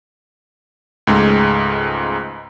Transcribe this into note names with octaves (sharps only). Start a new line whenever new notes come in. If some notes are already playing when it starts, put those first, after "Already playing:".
C#2 G#2 G#3 A3